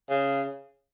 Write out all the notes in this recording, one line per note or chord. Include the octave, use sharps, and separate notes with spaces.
C#3